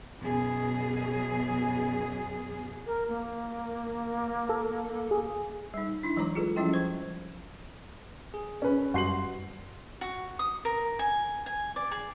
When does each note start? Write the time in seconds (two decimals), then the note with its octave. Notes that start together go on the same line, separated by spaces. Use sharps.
0.22 F#2 B2 G#4
2.86 A#4
3.08 A#3
4.49 A4
5.11 G#4
5.74 G3 D#4
6.03 D4 E4
6.17 E3 F#3 G#3 C#5 A#5 D6
6.35 F4 G#4 A4 B4
6.56 F3 G3 C#4 E4 D#5 G5
6.72 F3 C5 C#6
8.34 G#4
8.62 C#4 B4
8.94 F#2 G3 F#4 C6 C7 F#7
10.01 F#4
10.39 D#6
10.65 A#4
10.99 G#5
11.46 G#5
11.76 D5
11.92 G#4